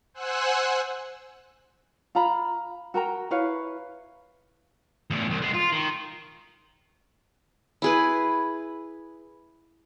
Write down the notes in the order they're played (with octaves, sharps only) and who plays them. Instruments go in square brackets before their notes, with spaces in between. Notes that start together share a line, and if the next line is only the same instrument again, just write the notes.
[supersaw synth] C5 F#5 G#5 E6 F#6
[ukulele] F4 F5 A#5 B5
F#4 A#4 G5 A#5
E4 B4 C#5 F5
[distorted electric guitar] E2 A2
C2
G#3 B3
F4
D#3
[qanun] E4 G#4 B4